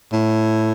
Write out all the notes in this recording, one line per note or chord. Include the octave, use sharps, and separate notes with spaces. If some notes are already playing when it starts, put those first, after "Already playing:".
A2